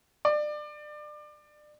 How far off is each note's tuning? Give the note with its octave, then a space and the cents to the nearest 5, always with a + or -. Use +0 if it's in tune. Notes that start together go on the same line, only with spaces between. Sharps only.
D5 +30